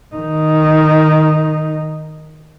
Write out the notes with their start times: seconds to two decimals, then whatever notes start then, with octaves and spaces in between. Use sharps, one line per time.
0.15 D#3 D#4